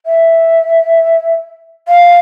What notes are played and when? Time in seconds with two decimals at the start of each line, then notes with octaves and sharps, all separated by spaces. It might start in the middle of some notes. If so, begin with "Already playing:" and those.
0.06 E5
1.88 F5